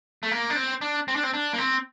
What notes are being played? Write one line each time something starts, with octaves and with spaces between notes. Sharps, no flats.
A3
A#3
D4
C4
D4
C4
D4
C4
D4
A#3
C4